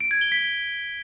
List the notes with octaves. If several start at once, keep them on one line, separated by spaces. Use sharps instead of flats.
D7
G#6
G7
B6